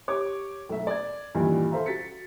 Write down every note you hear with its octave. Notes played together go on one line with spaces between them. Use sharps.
G4 C#5 D6
B1 A3 E5
D5 G#6
G2 A#2 D#3 E3
A4 C5 E5 F5 A#5
F#4 A6 B6 C#7